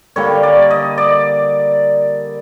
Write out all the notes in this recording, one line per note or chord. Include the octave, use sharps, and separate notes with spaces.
D3 G3 A#3 C#5
D5
D#5
D5